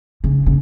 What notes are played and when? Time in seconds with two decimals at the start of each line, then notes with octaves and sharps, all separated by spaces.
0.24 C#3
0.46 C#3